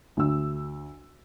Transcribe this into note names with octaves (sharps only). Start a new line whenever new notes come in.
D2 E6